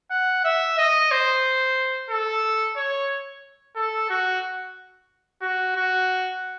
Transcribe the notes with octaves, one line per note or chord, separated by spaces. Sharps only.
F#5
E5
D#5
C5
A4
C#5
A4
F#4
F#4
F#4